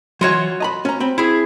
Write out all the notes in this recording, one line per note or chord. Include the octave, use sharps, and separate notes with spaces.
E3 F#3 F4 F#4 C#5
D#5 A#5 B5
C#4 A#5
C4 B5
E4 G#4